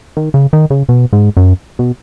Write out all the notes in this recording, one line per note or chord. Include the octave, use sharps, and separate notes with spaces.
D#3
C#3
D#3
C#3
B2
G#2
F#2
B2